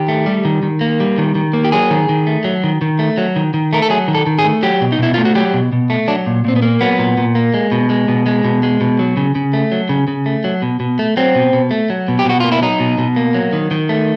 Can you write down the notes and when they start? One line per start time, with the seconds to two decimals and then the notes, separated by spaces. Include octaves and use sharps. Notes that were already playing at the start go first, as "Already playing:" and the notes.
Already playing: D#3 G4
0.08 A3
0.26 G3
0.45 D#3
0.63 D#3
0.81 A#3
1.00 G3
1.18 D#3
1.35 D#3
1.53 A#3
1.65 G4
1.72 F#3 G#4
1.91 D#3
2.09 D#3
2.27 A3
2.44 F#3
2.64 D#3
2.81 D#3
2.99 A3
3.18 F#3
3.36 D#3
3.54 D#3
3.73 A3 A#4
3.82 A4
3.90 F#3 G#4
4.08 D#3
4.15 A4
4.27 D#3
4.39 G#4
4.44 A3
4.63 F#3 G4
4.81 B2
4.92 D#4
4.99 B2 E4
5.14 A3 F4
5.25 F#4
5.35 F#3 G4
5.54 B2
5.72 B2
5.90 A3
6.08 F#3 D4
6.27 A#2
6.45 A#2 C4
6.56 B3
6.62 A#3
6.81 F#3 B3
6.99 A#2
7.18 A#2
7.35 A#3
7.54 G#3
7.72 B2
7.90 G#3
8.08 B2
8.26 G#3
8.44 B2
8.63 G#3
8.81 B2
8.99 F#3
9.17 C#3
9.35 C#3
9.53 A3
9.72 F#3
9.89 C#3
10.08 C#3
10.26 A3
10.44 F#3
10.62 B2
10.80 B2
10.99 A3
11.17 F#3 C4
11.35 B2
11.53 B2
11.71 A3
11.90 F#3
12.08 B2
12.19 G4
12.25 B2 F#4
12.40 A#3 F4
12.52 E4
12.62 F#3 D#4
12.80 B2
12.98 B2
13.16 A#3
13.35 F#3
13.53 D#3
13.71 D#3
13.89 A3